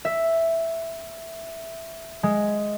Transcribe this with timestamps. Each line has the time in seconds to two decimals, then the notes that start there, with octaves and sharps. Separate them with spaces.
0.05 E5
2.23 G#3